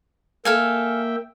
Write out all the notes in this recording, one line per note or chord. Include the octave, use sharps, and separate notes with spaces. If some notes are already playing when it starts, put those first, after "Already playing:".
A#3 A4 E5 F5 G5 G#5